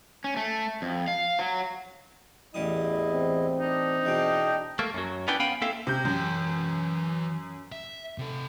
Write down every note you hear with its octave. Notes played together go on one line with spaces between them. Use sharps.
C#4
A3
F2
F5
F#3
A1 E2 G3 E4 D#5 D#6
C4
D4 D#4
E2 B2 D4 D#5 G5
A3 A#3
F#2 F#3
B3 C#4 D4 E4 B4 G5
B3 C#4 F5 G5 G#5 B5
A#3 C4 E4 A4 E5 F5
C3 G6
F#2 E3 G5
E5
C3 A4